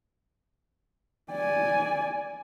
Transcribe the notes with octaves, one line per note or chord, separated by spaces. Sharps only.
D5 G#5